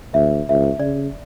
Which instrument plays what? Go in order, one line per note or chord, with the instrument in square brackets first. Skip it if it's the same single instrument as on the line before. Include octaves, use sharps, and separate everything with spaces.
[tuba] D2 [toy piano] E5
[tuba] C#2 [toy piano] E5
[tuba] C#3 [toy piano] D5